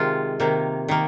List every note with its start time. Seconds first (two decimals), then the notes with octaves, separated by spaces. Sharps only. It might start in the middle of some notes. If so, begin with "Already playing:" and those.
Already playing: C3 D#3 G#3 F4
0.40 C3 D#3 A#3
0.88 D#3 A#3